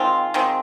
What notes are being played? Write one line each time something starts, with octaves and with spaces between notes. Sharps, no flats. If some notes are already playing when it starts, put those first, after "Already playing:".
Already playing: D#3 G#3 C4 F4
D#3 G#3 C4